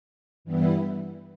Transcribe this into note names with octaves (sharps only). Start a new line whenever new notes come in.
G2 E3 G3 B3 E4